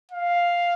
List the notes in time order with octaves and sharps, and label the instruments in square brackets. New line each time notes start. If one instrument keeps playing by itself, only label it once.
[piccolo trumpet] F5